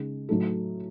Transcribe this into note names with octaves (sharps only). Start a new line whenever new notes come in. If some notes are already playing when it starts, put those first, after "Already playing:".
Already playing: C#3 G#3 D#4 G#4
A2 F#3 A3 D#4 A4